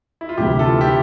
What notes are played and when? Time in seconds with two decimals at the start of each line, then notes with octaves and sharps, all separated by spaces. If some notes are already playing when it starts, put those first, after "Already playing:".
0.21 E4
0.29 F4
0.38 D2 C3 E3 E4 G4
0.59 F4 A4
0.81 E4 G4